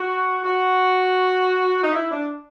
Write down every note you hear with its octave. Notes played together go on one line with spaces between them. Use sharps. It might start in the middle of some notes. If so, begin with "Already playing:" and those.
Already playing: F#4
F#4
D#4
E4
D4